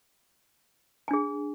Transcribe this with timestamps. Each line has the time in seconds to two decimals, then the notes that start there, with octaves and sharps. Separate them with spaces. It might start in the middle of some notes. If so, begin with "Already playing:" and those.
1.08 G#5
1.11 D4
1.13 G#4